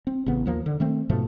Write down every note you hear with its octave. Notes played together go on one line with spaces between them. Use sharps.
C4
A1 C#3 B3
D#2 F3 A#3
D3
D#3 A3 C4
G#2 B2 F3 A3